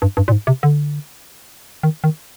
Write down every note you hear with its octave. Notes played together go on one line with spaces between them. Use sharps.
G2
G2
A#2
G#2
C3
D3
D#3
D#3